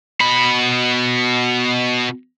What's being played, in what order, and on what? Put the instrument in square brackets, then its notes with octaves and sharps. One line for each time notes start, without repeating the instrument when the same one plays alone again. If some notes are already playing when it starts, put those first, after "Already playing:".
[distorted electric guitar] B2 B5